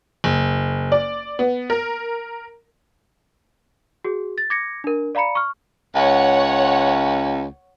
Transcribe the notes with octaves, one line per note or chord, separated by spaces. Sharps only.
F#1
D5
B3
A#4
F#4 G#4
A6
D6 G#6 A#6 C#7
D4 A#4
D5 F5 A#5 B5 C#7
C#6 F6
C#2 C#5 F#5